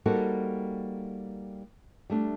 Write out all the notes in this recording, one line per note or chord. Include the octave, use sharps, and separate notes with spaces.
G3 A#3 D#4 F#4 A4 C5
G3 A3 D4